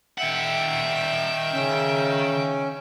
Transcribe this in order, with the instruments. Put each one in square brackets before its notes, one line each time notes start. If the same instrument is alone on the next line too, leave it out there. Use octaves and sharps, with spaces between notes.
[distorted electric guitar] D#3 F#5 [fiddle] E5 G5
[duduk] C#3 [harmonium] C#4